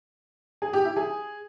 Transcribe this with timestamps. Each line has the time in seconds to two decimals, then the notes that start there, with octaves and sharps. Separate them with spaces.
0.62 G#4
0.73 G4
0.85 E4
0.96 G#4